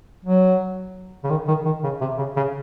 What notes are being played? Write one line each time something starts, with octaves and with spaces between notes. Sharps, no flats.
F#3
C#3
D#3
D#3
D#3
C#3
C3
C#3
C#3